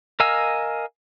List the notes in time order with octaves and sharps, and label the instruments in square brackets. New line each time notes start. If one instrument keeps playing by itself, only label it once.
[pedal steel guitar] A#4 D#5 F5 G#5 E6